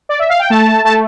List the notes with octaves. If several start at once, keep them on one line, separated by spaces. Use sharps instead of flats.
D5
E5
F5
G5
A3 A5
A3 A5